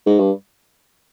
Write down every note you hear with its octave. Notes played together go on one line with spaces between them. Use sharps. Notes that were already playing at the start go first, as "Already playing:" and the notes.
G#2
G2